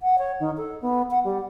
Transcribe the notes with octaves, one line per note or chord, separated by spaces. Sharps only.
F#5
C#5
D#3
A4
B3
F#5
G3